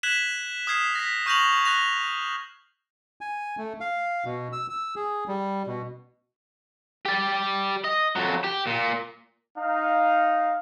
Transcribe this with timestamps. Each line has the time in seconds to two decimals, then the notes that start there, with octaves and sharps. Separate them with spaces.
0.03 F#6 G#6 B6 E7 F#7
0.67 D#6 F6 G#6 C7 E7
0.95 A#6 B6
1.26 C#6 F6 G6 A#6 F7 F#7
1.65 F#6 A#6 F7
3.21 G#5
3.58 A3
3.81 F5
4.25 B2
4.52 E6
4.70 E6
4.96 G#4
5.28 G3
5.67 B2
7.05 G4 D5
7.84 D#5
8.16 F2 F#3
8.44 G4
8.67 A#2
9.58 D#4 F5